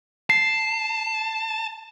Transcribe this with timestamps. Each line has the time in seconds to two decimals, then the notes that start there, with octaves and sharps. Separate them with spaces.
0.30 A5 C7